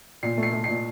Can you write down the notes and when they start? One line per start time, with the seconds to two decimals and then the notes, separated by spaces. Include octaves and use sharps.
0.23 A#2 C7
0.37 A3
0.43 C7
0.53 A3
0.64 A#2 C7